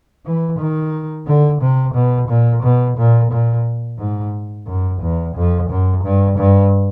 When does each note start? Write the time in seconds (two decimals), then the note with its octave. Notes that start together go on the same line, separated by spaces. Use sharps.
0.25 E3
0.59 D#3
1.26 D3
1.61 C3
1.95 B2
2.29 A#2
2.63 B2
2.97 A#2
3.31 A#2
3.99 G#2
4.67 F#2
5.02 E2
5.35 F2
5.69 F#2
6.04 G2
6.38 G2